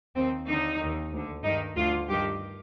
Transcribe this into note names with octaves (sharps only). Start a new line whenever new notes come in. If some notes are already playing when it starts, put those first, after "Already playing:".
D#2 D#3 C4
D#2 D3 D#4
D#2 D#3
D2 D3
G2 D#3 D#4
D2 D3 F4
G2 D#3 G4